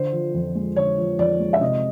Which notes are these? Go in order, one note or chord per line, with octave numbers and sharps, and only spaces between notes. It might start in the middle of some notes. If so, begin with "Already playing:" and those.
Already playing: D3 C5
F3
F2
G#3
D3 C#5
F3
F2 D5
G#3
E5
C3 D#5